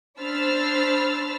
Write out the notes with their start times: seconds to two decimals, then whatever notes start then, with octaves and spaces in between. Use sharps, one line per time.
0.20 D4 C5 B5 E6 F6 A6